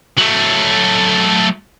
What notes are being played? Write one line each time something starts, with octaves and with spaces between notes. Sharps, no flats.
F#3 A3